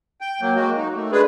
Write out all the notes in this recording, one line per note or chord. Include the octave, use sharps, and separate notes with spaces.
G5
F#3 A#3
G#3 A#3 F#4
D#4
A3
G#3 D4 G#4 B4